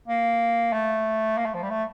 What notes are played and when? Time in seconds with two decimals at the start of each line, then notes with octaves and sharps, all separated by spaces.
0.08 A#3
0.73 A3
1.38 A#3
1.45 A3
1.54 F3
1.62 G3
1.70 A3